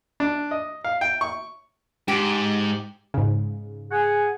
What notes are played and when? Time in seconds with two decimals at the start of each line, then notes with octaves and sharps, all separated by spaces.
0.20 D4
0.51 D#5
0.84 F5
1.01 G5
1.21 C#6
2.08 G#2 G4
3.14 G#2 C#3
3.91 G#4 F#5 G#5